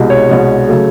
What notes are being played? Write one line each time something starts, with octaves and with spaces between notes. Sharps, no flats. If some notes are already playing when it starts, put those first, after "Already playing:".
Already playing: C2 B2 G#3
C#5
C2 B2 G#3
C#3 F#3 A3